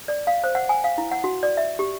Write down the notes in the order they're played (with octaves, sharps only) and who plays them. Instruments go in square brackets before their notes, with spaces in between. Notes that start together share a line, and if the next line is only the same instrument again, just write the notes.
[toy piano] D5
F5
C5
F#5
G#5
F5
E4
F#5
F#4
D5
E5
G4